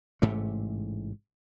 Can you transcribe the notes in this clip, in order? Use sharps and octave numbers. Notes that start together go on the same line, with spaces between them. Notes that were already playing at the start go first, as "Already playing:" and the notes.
A1 G#2 C3 A3